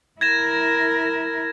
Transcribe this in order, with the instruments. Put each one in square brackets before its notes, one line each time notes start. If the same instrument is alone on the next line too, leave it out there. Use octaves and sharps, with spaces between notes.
[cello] E4 A#4 [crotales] G#6 A#6 E7